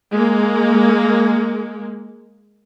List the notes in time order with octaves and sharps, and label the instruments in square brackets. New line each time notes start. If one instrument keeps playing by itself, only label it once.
[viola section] G#3 A#3